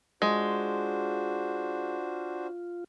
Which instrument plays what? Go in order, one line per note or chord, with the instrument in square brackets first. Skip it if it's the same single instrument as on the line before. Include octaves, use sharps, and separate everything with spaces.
[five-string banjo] G#3 [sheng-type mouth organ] D4 F#4 C5 [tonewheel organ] F4